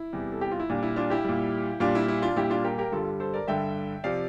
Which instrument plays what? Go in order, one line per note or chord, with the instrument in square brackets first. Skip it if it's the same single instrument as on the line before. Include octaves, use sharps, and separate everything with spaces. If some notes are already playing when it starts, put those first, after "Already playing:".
Already playing: [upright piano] E4
E2 C3 G3
A4
G4
F4
E4
A#2 G3 D4
E4
D4 F4
E4 G4
A#2 G3
A#2 G3 D4 F4
E4
E4
D4 F4
A#2 G3 E4 G4
D4 F4
G4 A#4
G4 A#4
G2 D3 G3 F4 A4
A4 C5
A#4 D5
G2 D3 G3 E5 G5
C3 F3 D5 F5